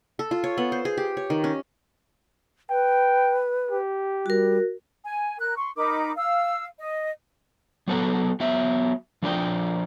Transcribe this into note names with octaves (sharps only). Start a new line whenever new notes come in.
A4
F4
C#5
B3
C5
G#4
G4
C#5
D#3
C#4
B4 G5
G4
G3 F#4 A#4
G#5
A#4 F#6
C6 C#6
D#4 A#4 B5 D6
F5 E6
D#5
F#3 B3 A4 F#5
F#3 B3 E5
F3 D4 D5 G5